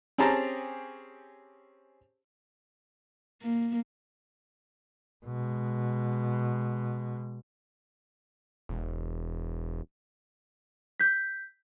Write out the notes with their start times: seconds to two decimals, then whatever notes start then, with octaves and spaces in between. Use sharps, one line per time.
0.18 C4 C#4 G4 G#4 A5 A#5
3.42 A#3
5.25 B2 G#3
8.69 E1
11.00 G6 B6